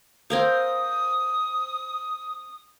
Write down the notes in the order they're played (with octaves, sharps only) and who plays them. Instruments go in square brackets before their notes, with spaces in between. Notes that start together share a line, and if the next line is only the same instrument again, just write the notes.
[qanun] C4 A#4 F5 [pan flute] D#6